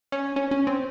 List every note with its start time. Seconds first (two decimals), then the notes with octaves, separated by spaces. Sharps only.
0.12 C#4
0.36 C#4
0.51 C#4
0.67 C4